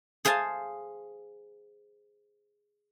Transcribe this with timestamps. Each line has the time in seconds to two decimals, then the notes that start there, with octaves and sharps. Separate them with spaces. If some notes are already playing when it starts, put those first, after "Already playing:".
0.25 G#4 C5 F5 G#5 A5